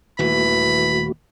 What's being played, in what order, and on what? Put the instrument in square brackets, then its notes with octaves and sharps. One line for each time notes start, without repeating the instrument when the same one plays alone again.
[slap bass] D#1 D#2 [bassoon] E3 [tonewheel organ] A3 F#4 [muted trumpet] B5